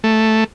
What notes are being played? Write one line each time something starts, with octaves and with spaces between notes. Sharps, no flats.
A3